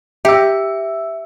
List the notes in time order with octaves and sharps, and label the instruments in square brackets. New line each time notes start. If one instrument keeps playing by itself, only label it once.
[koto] G4 [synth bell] E5 E6